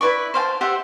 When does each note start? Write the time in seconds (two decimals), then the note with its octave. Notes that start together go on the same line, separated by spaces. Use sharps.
0.01 E4 B4 D5 C#6
0.34 C5 F5 G5 A5
0.61 G4 C5 E5 F#5